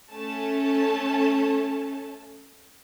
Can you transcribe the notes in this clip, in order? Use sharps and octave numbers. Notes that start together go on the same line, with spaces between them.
A3 C#4 A4 A5